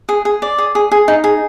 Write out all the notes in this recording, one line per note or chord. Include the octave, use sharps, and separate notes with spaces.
G#4
G#4
D5
G#4
G#4
G#4
D#4
G#4